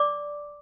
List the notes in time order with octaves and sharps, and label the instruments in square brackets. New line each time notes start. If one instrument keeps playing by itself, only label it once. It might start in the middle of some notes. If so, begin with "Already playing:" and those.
Already playing: [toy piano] D5 D6